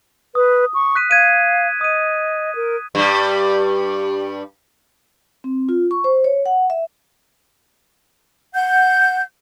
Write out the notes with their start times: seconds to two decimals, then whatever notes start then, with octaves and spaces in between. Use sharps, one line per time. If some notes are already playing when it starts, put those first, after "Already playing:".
0.35 B4 D#6
0.74 C#6
0.96 F#6 B6 D#7
1.11 F5 G#6 D#7
1.81 D#5 D#6 D#7
2.55 A#4
2.95 G2 G3
5.44 C4
5.69 F4
5.91 C#6
6.04 C5
6.24 C#5
6.46 F#5
6.70 E5
8.54 F#5 G6